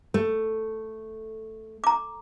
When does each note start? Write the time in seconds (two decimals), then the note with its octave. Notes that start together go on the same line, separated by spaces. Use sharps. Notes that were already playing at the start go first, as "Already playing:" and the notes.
0.14 A3
1.84 A#5 D6